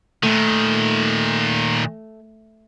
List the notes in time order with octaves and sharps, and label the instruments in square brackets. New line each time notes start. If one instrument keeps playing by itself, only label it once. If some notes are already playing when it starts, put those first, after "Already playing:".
[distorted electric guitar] A#2 D#3 [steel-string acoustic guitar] A3